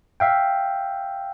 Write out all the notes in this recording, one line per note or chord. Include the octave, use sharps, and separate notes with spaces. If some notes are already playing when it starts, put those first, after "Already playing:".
E5 F5 G5